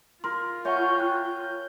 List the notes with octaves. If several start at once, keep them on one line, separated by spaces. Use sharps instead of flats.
F4 A#4 C6
C#5 E5 F#5 G#5 C#6 G6
G5 F#6